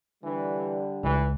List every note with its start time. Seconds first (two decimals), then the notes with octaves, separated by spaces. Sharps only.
0.23 D3 E3 G3
1.03 C#2 E3